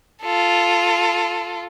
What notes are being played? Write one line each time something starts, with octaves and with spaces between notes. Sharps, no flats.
F4 A4